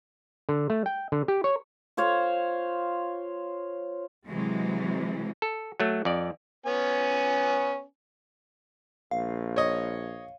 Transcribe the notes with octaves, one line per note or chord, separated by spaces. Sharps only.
D3
A3
G5
D3
G4
C#5
F4 C5 C#5 F5
C3 E3 F#3 G#3
A4
F#3 A3
F2 D5
B3 C#4 G#5
A#1 F5
C#5 D#5